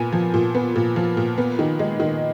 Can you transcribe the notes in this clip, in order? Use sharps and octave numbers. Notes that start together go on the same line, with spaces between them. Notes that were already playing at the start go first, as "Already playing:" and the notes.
Already playing: A#2 B3 G#5
F3
A#2
B3
A#2
F3
A#2
B3
D#3
G#3
D#3